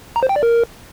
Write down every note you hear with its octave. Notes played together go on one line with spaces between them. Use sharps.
A#5
C5
G5
D5
A#4